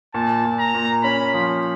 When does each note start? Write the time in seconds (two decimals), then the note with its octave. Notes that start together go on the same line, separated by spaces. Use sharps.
0.14 A#2 A5
0.45 A#2
0.59 A#5
0.75 A#2
1.03 C#4 B5
1.34 F3